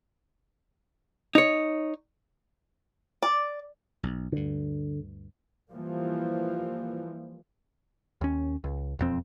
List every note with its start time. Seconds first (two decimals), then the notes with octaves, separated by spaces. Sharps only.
1.35 D#4 C#5
3.22 D5
4.03 B1
4.32 D2 G2 D3
5.71 E3 F3 G3 A#3
8.21 D#2 C#4
8.64 C#2
8.99 E1 F2 C4